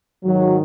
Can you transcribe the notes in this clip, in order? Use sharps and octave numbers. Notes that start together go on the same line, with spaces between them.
G#2 D#3 F#3